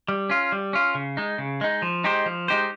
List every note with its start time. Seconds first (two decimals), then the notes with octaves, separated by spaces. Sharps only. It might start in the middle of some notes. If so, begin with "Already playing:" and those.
0.08 G3
0.30 C#4 F4
0.52 G3
0.73 C#4 F4
0.95 C#3
1.17 G#3 D#4
1.38 C#3
1.61 G#3 D#4
1.82 F3
2.04 G#3 D#4 G4 C5
2.26 F3
2.48 G#3 D#4 G4 C5